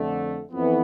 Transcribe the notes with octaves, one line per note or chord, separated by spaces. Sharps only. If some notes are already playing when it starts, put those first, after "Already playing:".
Already playing: F2 D3 A3
F2 E3 B3